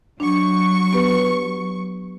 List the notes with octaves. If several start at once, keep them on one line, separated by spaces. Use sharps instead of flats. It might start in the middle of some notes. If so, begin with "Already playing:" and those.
F#3 D4 C#6
B3 G4 B4